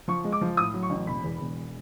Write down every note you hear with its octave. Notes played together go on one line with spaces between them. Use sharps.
F3 C#6
G#3
D6
F3
A2 D#6
F#3
C#6
A1
E1 B5
E2
E1